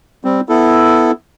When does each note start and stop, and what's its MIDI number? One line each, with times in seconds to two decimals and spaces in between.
0.25 0.41 55
0.25 0.41 60
0.49 1.11 59
0.49 1.11 64
0.49 1.11 69